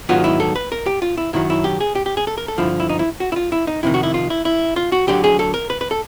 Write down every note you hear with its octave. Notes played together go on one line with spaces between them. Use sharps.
G#2 D#3 F#3 B3 D#4 F4
E4
A4
B4
A#4
G4
F4
E4
F#2 D#3 F#3 E4
E4
G4
G#4
G4
G4
G#4
A4
A#4
A4
G2 D3 F3 E4
E4
D#4
E4
F#4
E4
F4
E4
D#4
F2 C3 D#3 E4
F#4
E4
F4
E4
E4
F4
F#4
D2 D3 F#3 G4
G#4
A4
A#4
B4
B4
A4